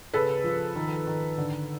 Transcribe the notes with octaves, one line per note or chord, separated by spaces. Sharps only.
C#3 A4 B4
F3
D#3
D#3
D3